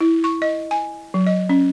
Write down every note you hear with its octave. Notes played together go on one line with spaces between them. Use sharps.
E4
C#6
D#5
G#5
F#3
D#5
C#4